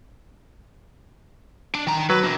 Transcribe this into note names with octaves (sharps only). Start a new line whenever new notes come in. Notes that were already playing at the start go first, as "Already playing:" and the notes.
D4
D#3 A#5
F#3 B4
D4 A#4